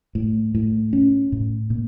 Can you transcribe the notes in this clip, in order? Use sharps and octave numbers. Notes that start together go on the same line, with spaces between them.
A2
A2
C#4
A2
A#2